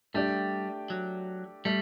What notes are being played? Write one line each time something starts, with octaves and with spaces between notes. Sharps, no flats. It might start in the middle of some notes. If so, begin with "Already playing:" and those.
G3 A3 D4 G4 D5
F#3
G3 A3